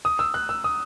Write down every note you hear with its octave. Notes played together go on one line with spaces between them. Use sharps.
D#6
E6
F#6
E6
D#6